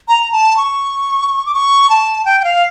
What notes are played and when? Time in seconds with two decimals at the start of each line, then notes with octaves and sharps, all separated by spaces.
0.08 A#5
0.32 A5
0.57 C#6
1.46 D6
1.54 C#6
1.90 A5
2.25 G5
2.40 G5
2.44 F5